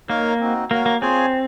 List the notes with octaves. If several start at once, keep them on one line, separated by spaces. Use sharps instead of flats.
A#3 D#4 A#4 C#5 F5
C4 D#4 F#4
A#3 F#4 A#4 C#5 F5
A#3
C4 F4 G#4 C#5 G#5